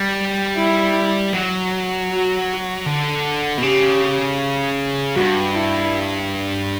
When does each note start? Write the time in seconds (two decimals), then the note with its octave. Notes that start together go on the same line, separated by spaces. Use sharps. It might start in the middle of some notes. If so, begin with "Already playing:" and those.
Already playing: G3
0.57 E4
1.33 F#3
2.10 F#4
2.86 D3
3.58 B2
3.63 C#3 G4
5.16 G2 F#4
5.54 E4